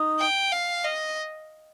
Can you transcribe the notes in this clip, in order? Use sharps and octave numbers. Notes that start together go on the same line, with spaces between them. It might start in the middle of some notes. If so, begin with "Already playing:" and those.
Already playing: D#4
G5
F5
D#5